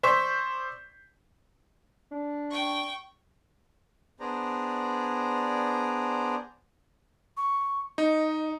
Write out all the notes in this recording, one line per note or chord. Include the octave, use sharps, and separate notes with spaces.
C5 D5 C#6 E6 G6 B6
D4
G5 C#6
B3 D4 G#4 C5 D5 A#5
C#6
D#4 D#5